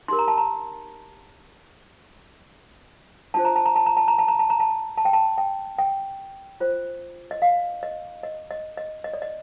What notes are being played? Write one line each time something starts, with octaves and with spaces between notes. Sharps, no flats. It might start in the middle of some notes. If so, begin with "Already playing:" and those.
D#4 G4 A#4 C6
A#5
A5
A#5
D4 F4 C5 A5
A#5
A5
A#5
A5
A#5
A5
A#5
A5
A#5
A5
A#5
A5
A5
G5
A5
G5
G5
F4 C5
D#5
F5
D#5
D#5
D#5
D#5
D#5
D5
D#5